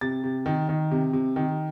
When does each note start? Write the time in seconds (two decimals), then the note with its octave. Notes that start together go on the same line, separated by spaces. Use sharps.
0.01 C3 A6
0.24 C3
0.46 D#3
0.69 D#3
0.91 C3
1.13 C3
1.36 D#3